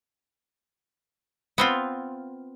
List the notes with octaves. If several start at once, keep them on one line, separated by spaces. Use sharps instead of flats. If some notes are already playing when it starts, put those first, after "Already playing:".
B3 C4 F4